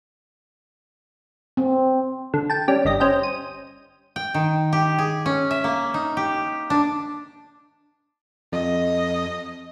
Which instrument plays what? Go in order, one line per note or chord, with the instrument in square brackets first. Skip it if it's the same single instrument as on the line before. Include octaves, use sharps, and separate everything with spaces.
[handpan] C4
[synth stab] D3
G5 A5
G3 C#4 G4
G1 G3 D#5 A#6
C#4 C5 D#5 G5
D#7
[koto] G5
D#3
G4
G#4
C#4
E5
A#3
D#4
G4
D4
[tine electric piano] F2 [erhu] D#5